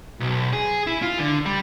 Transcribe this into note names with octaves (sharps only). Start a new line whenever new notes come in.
B1
G#4
E4
F4
D3
G3